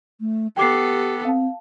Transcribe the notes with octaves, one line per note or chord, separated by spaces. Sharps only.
A3
B3 G4 A4 G5 D6 C7
C4 F5 A5